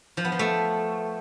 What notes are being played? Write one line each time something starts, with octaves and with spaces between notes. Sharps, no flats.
F3
B3
F3
A3